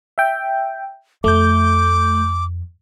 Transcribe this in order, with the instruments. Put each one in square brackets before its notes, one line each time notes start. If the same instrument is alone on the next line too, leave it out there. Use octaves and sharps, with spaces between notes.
[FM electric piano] E5 G5
[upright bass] F2 [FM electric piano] A3 G6 [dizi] D6